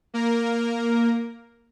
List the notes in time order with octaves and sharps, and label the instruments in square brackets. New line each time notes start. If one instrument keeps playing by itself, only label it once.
[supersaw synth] A#3 A#4